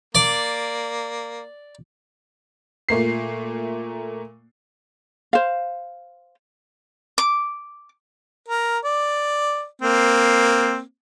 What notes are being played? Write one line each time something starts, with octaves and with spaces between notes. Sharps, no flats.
A#3 D5
A#2 A3 A#3 C7
C5 F5
D6
A#4
D5
A#3 C4